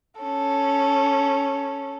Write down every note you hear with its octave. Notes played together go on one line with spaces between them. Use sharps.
C#4 A4